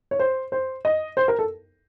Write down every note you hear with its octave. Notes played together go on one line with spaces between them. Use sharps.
C#5
C5
C5
D#5
C5
A#4
A4